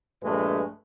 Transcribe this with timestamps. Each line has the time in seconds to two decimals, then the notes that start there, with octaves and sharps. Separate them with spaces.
0.22 A#1 G2 G#3 A3 B4